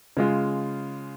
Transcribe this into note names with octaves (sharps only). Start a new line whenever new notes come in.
C#3 G#3 F4